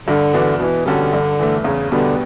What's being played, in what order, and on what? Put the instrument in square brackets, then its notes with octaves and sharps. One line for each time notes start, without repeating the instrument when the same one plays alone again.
[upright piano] G2 [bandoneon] D3
[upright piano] E3 B3 D4 F#4
[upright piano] B2 [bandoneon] E3
[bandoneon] D3 [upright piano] G3 C#4 F#4 A4
[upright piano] G2
E3 A3
[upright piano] E2 [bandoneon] C#3
[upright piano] B2 G3 B3 D4 [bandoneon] D3